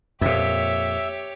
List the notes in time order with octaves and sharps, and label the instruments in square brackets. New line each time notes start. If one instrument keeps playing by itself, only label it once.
[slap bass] F2 A#2 [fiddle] G4 C#5 [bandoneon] E5